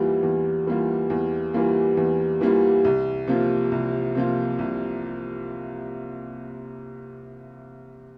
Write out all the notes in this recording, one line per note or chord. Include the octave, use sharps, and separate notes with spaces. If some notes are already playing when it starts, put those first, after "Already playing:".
Already playing: E2 E3 G3 A#3 F4
E2
E3 G3 A#3 F4
E2
E3 G3 A#3 F4
E2
E3 G3 A#3 F4
C2
C3 F3 A#3 F4
C2
C3 F3 A#3 F4
C2